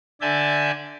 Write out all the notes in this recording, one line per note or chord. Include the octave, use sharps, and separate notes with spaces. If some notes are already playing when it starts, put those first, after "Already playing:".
D3 D5 E5 G#5 A5 G6